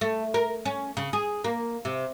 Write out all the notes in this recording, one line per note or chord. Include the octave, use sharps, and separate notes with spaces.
A3
A#4
C#4
C#3
G#4
A#3
C3